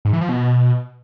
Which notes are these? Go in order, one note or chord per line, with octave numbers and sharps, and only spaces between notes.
G#2
E3
F3
B2